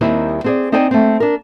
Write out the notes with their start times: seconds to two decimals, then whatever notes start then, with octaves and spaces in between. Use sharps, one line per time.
0.01 D#2 D#3 G3 C4 E4
0.44 C4 G#4 D5
0.72 C4 D#4 C5 D5 G5 G#5
0.91 A3 C4
1.20 D4 A#4